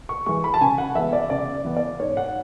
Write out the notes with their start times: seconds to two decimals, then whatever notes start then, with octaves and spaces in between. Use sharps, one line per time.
0.09 C#6
0.26 E3 G#3 C#6
0.44 B5
0.54 A5
0.61 C#3 G#5
0.78 F#5
0.95 E3 G#3 B3 E5
1.13 D5
1.30 C#3 D5
1.65 E3 B3
1.77 D5
2.00 G#2 C#5
2.17 F#5